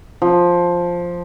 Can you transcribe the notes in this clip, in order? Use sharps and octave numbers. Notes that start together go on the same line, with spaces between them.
F3